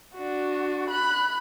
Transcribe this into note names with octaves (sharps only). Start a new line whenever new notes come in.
D4 F#4
B5 F#6